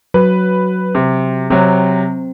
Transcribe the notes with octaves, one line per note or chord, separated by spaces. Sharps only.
F#3 B4
C3
C3 F#3 C4